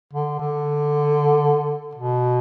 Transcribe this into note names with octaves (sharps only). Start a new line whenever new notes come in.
D3
D3
B2